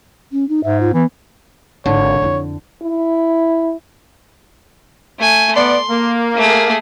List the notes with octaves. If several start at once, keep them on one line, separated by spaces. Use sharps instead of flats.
C#4
D#4
G#2 E5
F4
E3 B3
G#1 D3 C#5
F2 E4
E4
A3 G#5
B3 D5 C6
A#3
A3 G#4